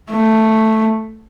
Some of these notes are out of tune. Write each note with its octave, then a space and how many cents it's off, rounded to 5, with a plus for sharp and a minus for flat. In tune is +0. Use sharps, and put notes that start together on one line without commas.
A3 +5